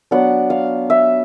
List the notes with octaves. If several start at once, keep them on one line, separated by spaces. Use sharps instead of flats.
F#3 B3 D4 F#5
F5
E5